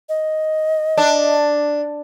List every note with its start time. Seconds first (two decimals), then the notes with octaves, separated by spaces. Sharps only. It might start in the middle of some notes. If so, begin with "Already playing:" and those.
0.09 D#5
0.98 D4